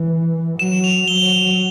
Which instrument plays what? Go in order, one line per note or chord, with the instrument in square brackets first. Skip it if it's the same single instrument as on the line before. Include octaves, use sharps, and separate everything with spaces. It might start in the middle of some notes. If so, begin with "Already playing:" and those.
Already playing: [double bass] E3
[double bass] F#3 [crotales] E7
[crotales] F7
[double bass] F#3 [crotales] G7